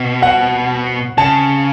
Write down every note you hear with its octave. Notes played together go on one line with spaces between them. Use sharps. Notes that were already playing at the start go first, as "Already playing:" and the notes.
Already playing: B2
F#5
C#3 A5